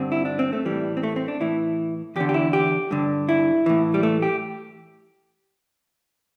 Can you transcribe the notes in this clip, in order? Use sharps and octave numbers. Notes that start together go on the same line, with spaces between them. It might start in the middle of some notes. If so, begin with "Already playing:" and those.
Already playing: G2 D3 C4
E4
D4
C4
A3
A2 E3 G3
C4
A3
C4
D4
A2 E3 E4
E2 D3 G4
G4
E4
G4
G2 D3
E4
A2 E3
G3
A3
G4